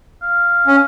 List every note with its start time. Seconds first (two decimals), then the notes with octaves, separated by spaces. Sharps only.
0.22 F5
0.67 C#4